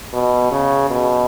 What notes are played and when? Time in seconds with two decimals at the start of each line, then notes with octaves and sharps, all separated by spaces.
0.13 B2
0.51 C#3
0.90 B2